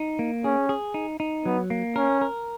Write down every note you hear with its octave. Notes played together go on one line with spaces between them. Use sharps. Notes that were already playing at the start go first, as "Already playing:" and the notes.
Already playing: D#4
A#3
C#4 G#4
G#4
D#4
D#4
F#3 B3
A#3
C#4 A#4
A#4